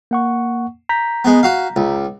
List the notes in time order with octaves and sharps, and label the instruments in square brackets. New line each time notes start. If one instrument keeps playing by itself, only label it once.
[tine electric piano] A#3 F#5 C#6
A#5 G6 B6
[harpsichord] G#3 B3
F#4 F5
C#2